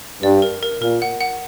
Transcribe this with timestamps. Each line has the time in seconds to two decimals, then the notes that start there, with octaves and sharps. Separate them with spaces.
0.23 G2 D5
0.42 A#4
0.63 A#4
0.81 A#2 A#4
1.02 F#5
1.21 F#5